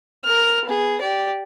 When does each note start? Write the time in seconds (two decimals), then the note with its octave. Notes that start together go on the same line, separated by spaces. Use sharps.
0.25 A#4 F6
0.66 B3 G#4
1.01 G4 D5